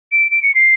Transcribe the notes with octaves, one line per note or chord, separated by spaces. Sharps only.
D7
D7
C#7
C7